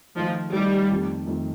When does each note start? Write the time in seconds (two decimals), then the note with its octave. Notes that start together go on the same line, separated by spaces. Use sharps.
0.16 D#3 F3 A3 D#4
0.53 D#3 G3 A3 D#4
0.90 F2 D#3 A3
1.27 F2 D#3 A3